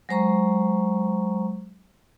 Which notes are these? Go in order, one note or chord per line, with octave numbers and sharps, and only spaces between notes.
F#3 G#3 C5 A#5 C#6